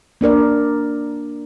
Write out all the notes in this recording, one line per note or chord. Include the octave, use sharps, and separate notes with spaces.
A#3 D4 A#4 D5